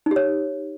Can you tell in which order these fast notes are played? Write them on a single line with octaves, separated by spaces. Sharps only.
D#4 G4 C#5